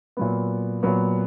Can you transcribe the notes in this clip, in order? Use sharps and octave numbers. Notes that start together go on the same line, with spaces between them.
A#2 F#3 B3
A#2 F#3 B3